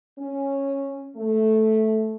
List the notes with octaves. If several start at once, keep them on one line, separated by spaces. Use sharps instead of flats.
C#4
A3